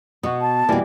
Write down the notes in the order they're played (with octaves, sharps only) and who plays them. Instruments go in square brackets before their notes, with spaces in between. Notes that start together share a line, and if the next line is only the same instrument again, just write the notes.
[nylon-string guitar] B2 [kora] B3 F#4
[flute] A5
[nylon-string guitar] B2 A#3 [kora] E3 G3